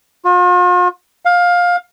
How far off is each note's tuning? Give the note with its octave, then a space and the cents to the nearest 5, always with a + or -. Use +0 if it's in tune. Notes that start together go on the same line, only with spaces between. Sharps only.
F4 +45
F5 +15